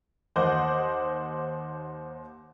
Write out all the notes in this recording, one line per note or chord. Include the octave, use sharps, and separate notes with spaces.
D#2 C5 D#5 F#5 D6 G6